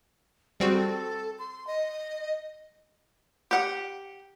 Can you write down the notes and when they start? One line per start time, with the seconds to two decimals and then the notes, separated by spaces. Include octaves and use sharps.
0.60 G3 C4 F#4 G#4
0.72 A4
1.39 C6
1.67 D#5
3.51 G4 F#5